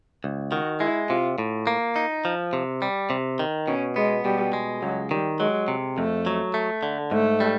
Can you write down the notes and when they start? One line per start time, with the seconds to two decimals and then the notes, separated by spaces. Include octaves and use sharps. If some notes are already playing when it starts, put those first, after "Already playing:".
0.24 C#2
0.52 D#3 F#4
0.80 G#3 E4
1.10 C3 F4
1.38 A2
1.67 A#3
1.96 D#4
2.25 F3
2.53 C3
2.82 G3
3.10 C3
3.39 D#3
3.68 B2 C#4
3.96 G#3 B3
4.25 B2 G3
4.53 G#3
4.82 C#2 F#3
5.11 D#3 G3
5.40 F#3 G#3
5.68 C3
5.98 F2 A3
6.26 F#3
6.54 A3
6.83 D3
7.11 G#2 A3
7.40 G3